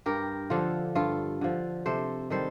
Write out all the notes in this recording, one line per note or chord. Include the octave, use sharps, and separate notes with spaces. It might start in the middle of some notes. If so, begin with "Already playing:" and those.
G2 G4 A#4
D3 F3 F4 A4
G2 F4 A4
D3 F3
C3 A4 C5
D#3 G3 A4 C5